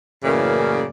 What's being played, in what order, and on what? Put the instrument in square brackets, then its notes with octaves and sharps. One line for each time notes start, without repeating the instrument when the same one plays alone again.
[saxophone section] F#2 A2 C#3 E3 A#3 D5